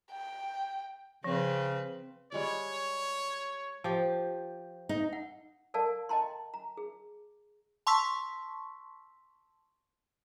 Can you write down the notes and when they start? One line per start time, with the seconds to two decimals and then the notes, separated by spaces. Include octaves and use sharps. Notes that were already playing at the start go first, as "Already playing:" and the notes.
0.12 G5
1.24 C#3 F3 C4 B4
2.32 G3 G#3 C#5 D5
3.84 F3 G4
4.89 D#4
5.13 F#5
5.74 A4 A#4 D5 F5 A5
6.09 D#5 G5 A5 A#5 C6
6.54 A#5
6.77 G#4
7.87 A5 C6 C#6 E6 B6